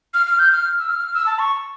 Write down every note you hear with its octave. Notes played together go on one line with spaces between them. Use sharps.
F6
F6
G6
F6
E6
F6
E6
A5
C#6